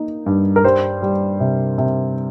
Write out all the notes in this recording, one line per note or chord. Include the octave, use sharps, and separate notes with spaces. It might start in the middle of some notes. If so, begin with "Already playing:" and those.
Already playing: A#3 D#4
G2
A#4
G3 C5
G3
C3
C3